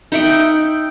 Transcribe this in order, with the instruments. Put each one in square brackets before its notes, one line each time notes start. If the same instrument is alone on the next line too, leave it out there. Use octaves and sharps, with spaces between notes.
[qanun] D#4 E5 F#5 G5